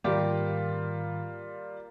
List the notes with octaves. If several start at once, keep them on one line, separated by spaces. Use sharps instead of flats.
G#2 D#3 G3 A#3 F4 G4 A#4